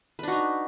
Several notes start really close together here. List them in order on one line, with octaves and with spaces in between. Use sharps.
B4 D4 F#4 D#4